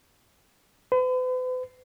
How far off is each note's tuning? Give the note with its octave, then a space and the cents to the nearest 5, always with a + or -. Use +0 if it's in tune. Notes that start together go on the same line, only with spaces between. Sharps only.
B4 +45